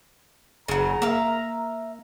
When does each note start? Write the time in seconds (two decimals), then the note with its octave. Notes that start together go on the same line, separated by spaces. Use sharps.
0.68 F#1 C#3 F#3 A#5
1.02 A#3 E5 F5